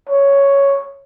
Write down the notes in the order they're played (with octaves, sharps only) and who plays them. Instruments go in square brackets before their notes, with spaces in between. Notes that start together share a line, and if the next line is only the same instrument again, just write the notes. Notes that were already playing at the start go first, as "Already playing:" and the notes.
[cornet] C#5